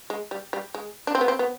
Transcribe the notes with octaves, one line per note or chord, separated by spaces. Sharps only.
G#3
G3
G3
G#3
D4
C4
B3
C4
B3